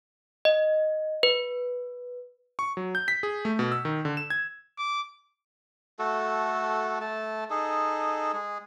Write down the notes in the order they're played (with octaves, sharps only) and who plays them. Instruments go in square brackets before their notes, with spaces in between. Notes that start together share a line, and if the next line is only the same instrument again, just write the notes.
[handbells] D#5
B4
[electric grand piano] C#6
F#3
G6
B6
G#4
A3
B2
E6
D#3
D3
E7
G#6
[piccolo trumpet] D6
[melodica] A3 F#4 A4
A3 A5
D#4 G#4 A4
G#3 G#4